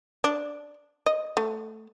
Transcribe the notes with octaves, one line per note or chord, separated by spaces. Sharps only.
D4
D#5
A3